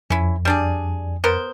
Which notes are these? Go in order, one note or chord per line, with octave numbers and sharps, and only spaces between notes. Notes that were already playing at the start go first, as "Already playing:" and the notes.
F2 C#4 E4
G3 D4 G#4
B3 A#4 C5